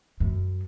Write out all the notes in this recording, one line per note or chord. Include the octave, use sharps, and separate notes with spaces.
F#2